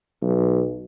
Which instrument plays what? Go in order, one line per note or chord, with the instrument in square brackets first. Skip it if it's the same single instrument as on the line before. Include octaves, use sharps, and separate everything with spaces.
[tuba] B1